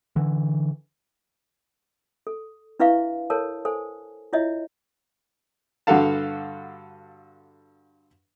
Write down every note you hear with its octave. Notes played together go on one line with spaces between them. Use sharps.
D3 E3
A4
D4 E4 B4 E5 F5 C#6
A4 A#4 C#5 A5
A4 C5 G#5
E4 F4 C#5 D#5 E5
G2 D3 F#4 A4 F5 A5